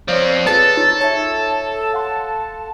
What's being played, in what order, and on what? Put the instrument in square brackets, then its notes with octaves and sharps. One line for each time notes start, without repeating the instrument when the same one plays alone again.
[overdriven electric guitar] F3 C4 [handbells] C#5 D5 F5
[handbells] F4 G#4 B4 [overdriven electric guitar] A4 [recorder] A6
[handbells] D#4 F4 C#5
[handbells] C#5 E5 [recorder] A5
[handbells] F5 F#5 C6